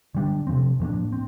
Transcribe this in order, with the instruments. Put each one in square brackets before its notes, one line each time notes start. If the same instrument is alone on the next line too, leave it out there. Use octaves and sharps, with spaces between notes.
[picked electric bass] D3 G3 D4
C3 F3 C4
A2 F3 A#3 D4
C4